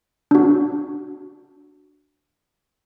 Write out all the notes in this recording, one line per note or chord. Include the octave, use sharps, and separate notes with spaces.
D4 F#4